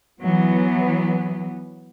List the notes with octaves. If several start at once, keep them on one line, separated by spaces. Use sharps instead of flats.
E3 F#3 B3